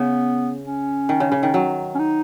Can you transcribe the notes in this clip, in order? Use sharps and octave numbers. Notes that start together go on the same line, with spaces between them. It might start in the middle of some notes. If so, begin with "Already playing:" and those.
Already playing: C#3 B3
C#4
D#3
C#3
C#3
D#3
F#3
C#4
D#4